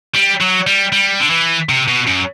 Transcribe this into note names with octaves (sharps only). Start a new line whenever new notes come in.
G3
F#3
G3
G3
D3
E3
C3
B2
F#2